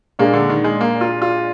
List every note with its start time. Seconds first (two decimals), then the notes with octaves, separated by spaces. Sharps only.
0.19 A#2 G#3 A#3 D4
0.34 D3
0.50 D#3
0.64 G#3
0.81 A#3
1.01 F4
1.22 F4